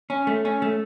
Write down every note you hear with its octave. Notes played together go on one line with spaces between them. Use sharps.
C#4
A3
C#4
A3